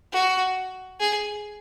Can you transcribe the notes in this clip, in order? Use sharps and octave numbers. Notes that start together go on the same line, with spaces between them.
F#4
G#4